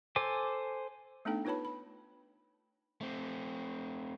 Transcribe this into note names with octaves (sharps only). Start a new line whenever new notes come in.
A4 C5 G#5 D6
A3 B3 D4 D#4 A4 G5
D#4 F4 B4 C#5 A5 B5
B5
A3 C4